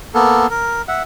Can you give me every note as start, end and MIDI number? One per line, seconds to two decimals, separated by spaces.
0.15 0.47 58
0.15 0.47 59
0.15 0.47 69
0.50 0.82 70
0.88 1.03 76
0.88 1.03 78